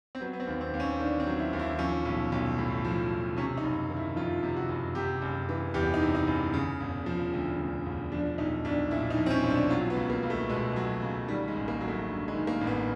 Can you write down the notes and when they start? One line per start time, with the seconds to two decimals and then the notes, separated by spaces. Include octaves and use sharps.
0.15 C4
0.20 F#3 B3
0.33 B3
0.40 C4
0.47 D#2
0.61 C4
0.74 D#2
0.80 C#4
1.00 D#3 D4
1.20 C4
1.27 F#3
1.39 E4
1.53 D#2
1.59 E4
1.79 F3 C#4
2.05 B1
2.32 B1
2.58 A2
2.85 F3
3.11 B1
3.37 C3 C#4
3.58 D#4
3.63 F#1
3.90 D#3
3.97 E4
4.16 F2 F4
4.43 C3
4.56 F#4
4.68 F#1
4.95 C3 G4
5.22 F#1
5.49 E3
5.74 E2 G4
5.94 D#4
6.02 C3
6.15 D#4
6.27 F#1
6.54 C#3
6.80 E1
7.06 F3
7.33 D2
7.59 C#3
7.86 E1
8.12 F3 D4
8.38 B1 D#4
8.65 B1 D4
8.91 A#2 E4
9.10 D#4
9.17 F3
9.26 C4
9.30 C#4
9.44 B1
9.50 D4
9.70 F#3 F4
9.90 B3
9.96 C#2
10.10 A#3
10.23 C#2
10.30 A3
10.50 B2 G#3
10.76 F#3
11.02 C#2
11.28 D#3 G3
11.48 G#3
11.55 A1
11.68 A#3
11.81 F#3
11.88 A3
12.08 G2
12.28 G#3
12.34 D#3
12.47 A#3
12.61 A1
12.67 B3